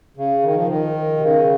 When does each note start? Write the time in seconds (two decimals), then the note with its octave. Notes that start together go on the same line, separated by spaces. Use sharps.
0.17 C#3
0.43 D#3
0.55 F3
0.68 D#3
1.17 C3
1.21 C#3